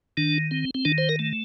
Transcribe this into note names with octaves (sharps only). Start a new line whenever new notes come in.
D#3 D4
C4
C4
D#3 D4
C5
A#4
A3